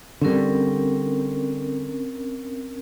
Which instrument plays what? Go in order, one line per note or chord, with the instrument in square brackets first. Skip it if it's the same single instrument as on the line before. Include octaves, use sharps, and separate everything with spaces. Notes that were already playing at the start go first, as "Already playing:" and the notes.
[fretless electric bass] D3 G3 [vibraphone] C4 C#4 A#4